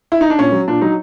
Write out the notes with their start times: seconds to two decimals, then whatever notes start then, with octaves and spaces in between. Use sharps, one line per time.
0.12 E4
0.21 D#4
0.30 D4
0.38 A#2 C#4
0.52 F#3
0.68 A#2 D4
0.81 F#3 D#4